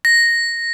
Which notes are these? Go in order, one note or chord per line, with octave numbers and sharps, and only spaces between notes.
A#6